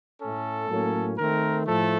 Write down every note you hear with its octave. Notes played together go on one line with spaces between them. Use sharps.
A2 A3 C#4 A4
A2 F#3 A#3 C#4
D#3 A3 C4 A#4
A2 F3 A3 A4